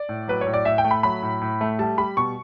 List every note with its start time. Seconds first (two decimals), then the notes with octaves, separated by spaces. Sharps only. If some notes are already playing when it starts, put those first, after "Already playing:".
Already playing: D5
0.09 A2
0.28 F#3 B4
0.41 C#5
0.46 A2
0.54 D5
0.65 A2 E5
0.78 G5
0.85 A3
0.91 B5
1.03 F#3 B5
1.22 A2
1.41 A2
1.61 A3
1.79 G3 A5
1.98 G3 B5
2.17 B2 C#6